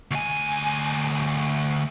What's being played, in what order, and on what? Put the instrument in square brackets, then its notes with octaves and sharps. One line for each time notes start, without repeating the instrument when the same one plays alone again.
[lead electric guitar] D2 G#5